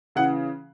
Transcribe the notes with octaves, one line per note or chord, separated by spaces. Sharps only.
C#3 E3 F#5